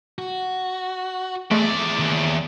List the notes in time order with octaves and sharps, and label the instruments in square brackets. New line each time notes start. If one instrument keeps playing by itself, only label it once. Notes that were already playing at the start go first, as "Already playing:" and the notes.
[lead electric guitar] F#4
[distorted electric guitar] E2 D5 [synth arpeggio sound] G#3 A3
[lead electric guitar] D#2